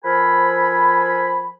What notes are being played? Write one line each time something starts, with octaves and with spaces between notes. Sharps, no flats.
F3 A4 A#4 C5 G#5 B5